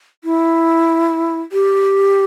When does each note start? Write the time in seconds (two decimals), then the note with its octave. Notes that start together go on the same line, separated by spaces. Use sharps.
0.24 E4
1.52 G4